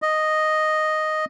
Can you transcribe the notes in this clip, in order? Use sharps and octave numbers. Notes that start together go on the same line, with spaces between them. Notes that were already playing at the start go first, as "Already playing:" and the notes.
D#5